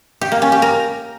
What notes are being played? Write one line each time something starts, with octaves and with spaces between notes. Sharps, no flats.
G4
A#3
C#4
G4
A#4